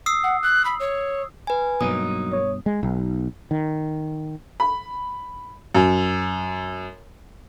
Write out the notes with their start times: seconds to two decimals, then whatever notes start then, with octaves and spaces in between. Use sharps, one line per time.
0.06 D#6 E6 C7
0.24 F#5
0.43 F#6
0.65 B5
0.80 C#5
1.47 B4 G#5
1.81 G2 B2 F#3 A#3 D#4 D#6
2.32 C#5
2.66 G#3
2.83 B1
3.51 D#3
4.60 B5
5.75 F#2